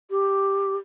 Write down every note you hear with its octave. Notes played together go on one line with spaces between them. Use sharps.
G4